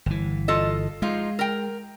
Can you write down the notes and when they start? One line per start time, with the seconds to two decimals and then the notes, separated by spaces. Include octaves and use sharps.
0.06 G1 E3
0.48 F4 A4 D#5
1.02 F3 G#3 D#4 F4
1.39 A#4 G5